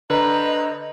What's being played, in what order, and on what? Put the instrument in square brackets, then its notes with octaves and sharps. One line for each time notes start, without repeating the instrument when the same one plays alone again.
[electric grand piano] D3 [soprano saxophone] B4 [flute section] C5 D#5 A#5